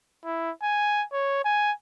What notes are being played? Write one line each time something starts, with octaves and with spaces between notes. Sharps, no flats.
E4
G#5
C#5
G#5